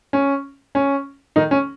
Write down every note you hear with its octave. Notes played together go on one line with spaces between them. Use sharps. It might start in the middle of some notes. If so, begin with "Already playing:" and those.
C#4
C#4
D#3 D#4
C#4